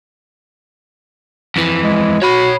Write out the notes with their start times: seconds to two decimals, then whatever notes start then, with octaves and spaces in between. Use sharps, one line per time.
1.56 F2 E3
1.83 G#3
2.22 F#4 C#5 B5